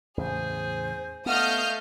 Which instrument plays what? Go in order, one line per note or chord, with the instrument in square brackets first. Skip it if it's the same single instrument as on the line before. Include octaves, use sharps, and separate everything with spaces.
[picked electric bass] E2 A2 C#3 [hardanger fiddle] G#4 [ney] C5
[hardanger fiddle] A3 D#5 [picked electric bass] B3 [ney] F5 [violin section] D#6 F6 G6